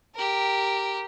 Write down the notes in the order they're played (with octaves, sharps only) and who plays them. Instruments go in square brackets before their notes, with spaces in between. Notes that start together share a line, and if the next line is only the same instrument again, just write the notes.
[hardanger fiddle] G4 A#4